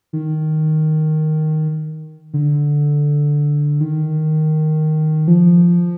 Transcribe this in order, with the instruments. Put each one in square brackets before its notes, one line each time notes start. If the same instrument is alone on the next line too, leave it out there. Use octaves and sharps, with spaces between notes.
[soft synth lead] D#3
D3
D#3
F3